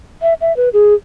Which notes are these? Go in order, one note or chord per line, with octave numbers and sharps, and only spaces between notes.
E5
E5
B4
G#4